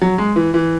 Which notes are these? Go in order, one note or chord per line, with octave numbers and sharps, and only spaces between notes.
F#3
G#3
E3
E3